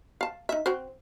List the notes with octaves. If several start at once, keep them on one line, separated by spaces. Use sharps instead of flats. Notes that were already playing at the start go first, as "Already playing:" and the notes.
F5 A5
D#4 E5
C4 F#4 C5